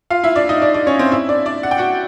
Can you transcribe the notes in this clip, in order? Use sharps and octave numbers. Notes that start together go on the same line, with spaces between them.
F4 F5
E4 E5
D4 D5
D#4 D#5
D4 D5
D4 D5
C#4 C#5
C4 C5
E4 E5
D4 D5
D4 D5
F#5
G5
F#4 F#5